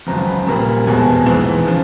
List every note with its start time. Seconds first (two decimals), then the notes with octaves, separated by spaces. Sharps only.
0.07 G#1 F#2 C#3 F3 A#5
0.27 B5
0.47 A#1 A#2 G3 A#3 A#5
0.66 G#5
0.87 F1 E2 B2 G#3 G#5
0.97 A5
1.06 G#5
1.26 A#1 G#2 E3
1.67 C#3 F3